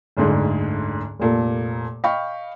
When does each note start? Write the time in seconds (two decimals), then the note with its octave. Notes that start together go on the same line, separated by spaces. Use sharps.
0.17 F#1 D2 G#2 D3
1.19 F1 A#2 A4
2.04 D#5 F5 G5 B5 C#6